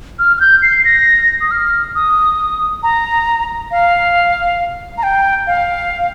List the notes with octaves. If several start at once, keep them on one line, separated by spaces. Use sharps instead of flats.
F6
F6
G6
C7
C7
A#6
D#6
F6
D#6
A#5
F5
A#5
G5
F5